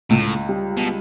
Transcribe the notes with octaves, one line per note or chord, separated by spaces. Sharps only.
C#2 A2
G3
B2